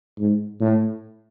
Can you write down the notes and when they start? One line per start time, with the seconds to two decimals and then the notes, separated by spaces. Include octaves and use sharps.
0.18 G#2
0.60 A2